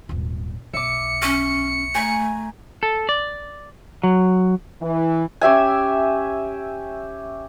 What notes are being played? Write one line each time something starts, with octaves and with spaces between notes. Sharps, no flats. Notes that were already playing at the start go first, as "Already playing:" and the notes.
D#1 G#1
B1 B3 E5 D6 C#7
C#4 C#6
A3 G#5 A#5
A4
D5
F#3
E3
C#4 G4 E5 G#5